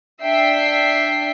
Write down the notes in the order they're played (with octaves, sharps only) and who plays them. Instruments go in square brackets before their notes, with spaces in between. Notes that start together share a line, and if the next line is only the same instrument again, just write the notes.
[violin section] D4 E5 G5 C7